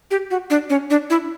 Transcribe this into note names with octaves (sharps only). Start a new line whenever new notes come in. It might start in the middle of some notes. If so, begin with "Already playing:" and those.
G4
F#4
D4
C#4
D4
E4